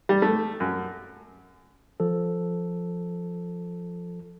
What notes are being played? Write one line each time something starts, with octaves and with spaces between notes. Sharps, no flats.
G3
A3
F#2
F3 A4